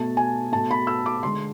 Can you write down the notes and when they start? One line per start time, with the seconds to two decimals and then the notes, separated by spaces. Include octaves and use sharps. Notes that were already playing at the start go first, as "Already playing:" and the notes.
Already playing: B2 A3 A5
0.17 G#5
0.52 B2 A3 A5
0.71 B5
0.87 E6
1.06 D6
1.23 D3 G#3 C6